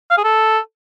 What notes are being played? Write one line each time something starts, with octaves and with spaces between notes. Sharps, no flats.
F5
G#4
A4